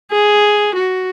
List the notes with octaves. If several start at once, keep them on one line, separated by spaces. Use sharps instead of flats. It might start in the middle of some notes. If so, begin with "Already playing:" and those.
G#4
F#4